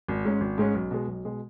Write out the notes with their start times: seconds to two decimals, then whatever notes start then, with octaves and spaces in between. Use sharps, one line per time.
0.08 G#1
0.25 G#2 G#3 C#4
0.41 G#1
0.58 G#2 G#3 C#4
0.74 B1
0.91 B2 G#3
1.08 B1
1.25 B2 G#3